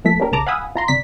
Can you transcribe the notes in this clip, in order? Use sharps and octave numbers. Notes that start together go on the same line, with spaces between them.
F3 A3 A#3 A4 B6
A#3 C#4 D4 G4 A#4
B1 C#3 A5 A#5 D6
F5 F#5 G#5 B5 D#6 E6
F4 A#5 C6
G1 C3 D5 B6